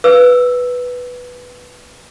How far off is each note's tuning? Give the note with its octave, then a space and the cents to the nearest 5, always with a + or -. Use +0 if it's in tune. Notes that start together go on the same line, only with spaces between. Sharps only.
B4 +0 E6 +0